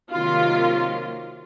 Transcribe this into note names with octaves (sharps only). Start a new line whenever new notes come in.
C3 D#3 F#3 A#3 F4